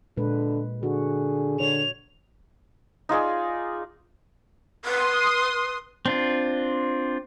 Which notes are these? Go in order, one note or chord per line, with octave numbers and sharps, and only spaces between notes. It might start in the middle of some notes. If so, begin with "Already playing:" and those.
A#2 D3 G#3 B4
D3 F#4 G#4
D3 C#5 F7
D#4 F4 G#4 D5
B4 C6 D#6
C4 D4 F4